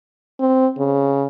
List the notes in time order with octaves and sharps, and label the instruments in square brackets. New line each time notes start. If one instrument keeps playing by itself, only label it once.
[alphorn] C4
C#3